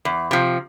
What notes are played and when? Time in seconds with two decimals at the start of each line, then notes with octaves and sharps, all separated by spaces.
0.05 E2
0.31 C3 F3